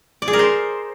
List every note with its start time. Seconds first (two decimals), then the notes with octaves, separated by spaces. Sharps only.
0.22 D5
0.28 G#4
0.33 A#4
0.39 C5